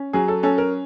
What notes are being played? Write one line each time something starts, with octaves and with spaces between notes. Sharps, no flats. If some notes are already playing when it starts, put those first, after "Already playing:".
Already playing: C#4
F#3 G#4
A4
C#4 A4
A#4